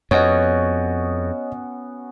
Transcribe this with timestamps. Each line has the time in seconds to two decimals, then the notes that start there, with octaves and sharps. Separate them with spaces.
0.11 F2 B3 C#4 F#4 C#5 D#5